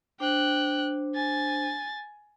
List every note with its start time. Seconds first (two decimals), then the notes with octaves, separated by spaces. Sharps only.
0.20 D4 C5 G5 F#6
1.14 G#5 A6